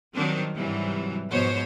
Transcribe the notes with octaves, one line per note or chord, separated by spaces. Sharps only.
D#3 F#3 G3 C4 D4
G#2 C3 E3 F#3 G3
G#2 B2 F3 B3 C5 C#5